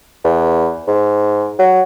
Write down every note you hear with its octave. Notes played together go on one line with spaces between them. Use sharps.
E2
G#2
F#3